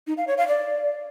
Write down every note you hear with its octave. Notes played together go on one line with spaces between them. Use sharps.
D#4
F5
C#5
F5
D5